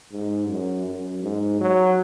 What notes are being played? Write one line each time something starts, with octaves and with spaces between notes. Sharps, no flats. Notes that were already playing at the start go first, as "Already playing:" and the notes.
G#2
F#2
F#2
G#2
F#3